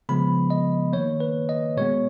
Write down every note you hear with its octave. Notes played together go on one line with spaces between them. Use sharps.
C#3 F3 G#3 B3 B5
D#5
D#3 A#3 C#5
B4
D#5
B2 G#3 B3 C#5